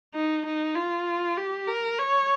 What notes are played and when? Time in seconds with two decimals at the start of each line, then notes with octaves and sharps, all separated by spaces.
0.14 D#4
0.46 D#4
0.75 F4
1.37 G4
1.67 A#4
1.99 C#5